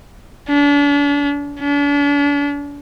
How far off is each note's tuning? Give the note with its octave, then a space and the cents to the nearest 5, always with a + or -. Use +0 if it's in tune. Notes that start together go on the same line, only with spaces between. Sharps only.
D4 -40
D4 -40